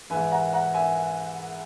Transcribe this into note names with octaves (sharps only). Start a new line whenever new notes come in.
G#2 E3 E5 G#5
F#5 A#5
F#5 A#5
E5 G#5